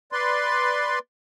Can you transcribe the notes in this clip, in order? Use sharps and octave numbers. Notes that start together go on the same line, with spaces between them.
B4 D5 C6